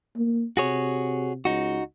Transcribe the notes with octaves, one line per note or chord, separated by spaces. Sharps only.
A#3
C3 F#4 G#4 C#5
C#2 D#4 F#4